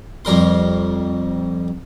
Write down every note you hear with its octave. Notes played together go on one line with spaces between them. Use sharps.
F2 G3 A#4 C6